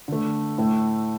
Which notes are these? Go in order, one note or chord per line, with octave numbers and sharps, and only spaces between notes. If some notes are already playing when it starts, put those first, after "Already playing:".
D3 A3
A2 A3